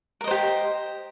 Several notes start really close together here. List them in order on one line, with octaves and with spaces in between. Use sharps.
A#4 D#5 C5 G4